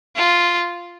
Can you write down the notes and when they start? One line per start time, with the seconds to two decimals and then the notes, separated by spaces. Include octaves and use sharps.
0.16 F4